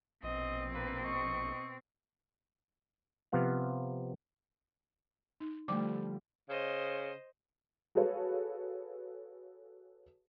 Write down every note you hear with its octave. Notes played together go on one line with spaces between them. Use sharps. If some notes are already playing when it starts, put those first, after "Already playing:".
A#1 B2 C4 D#5
A#3 B4
D#5 C#6
C3 F3 B3 F5 F#5
D#4
D3 F3 G3 A3 D6
C#3 C5 D#5
F#4 G#4 A4 B4 C#5 F5